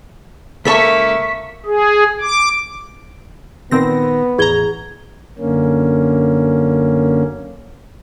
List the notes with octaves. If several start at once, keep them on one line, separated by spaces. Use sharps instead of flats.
C#2 A#3 A4 E5 A5 C#6 B6
G#4
D6
A#2 D#3 B3 C4 A#6
A1 E2 G#4 A#5 G#6 G7
F#2 D3 A#3 C#4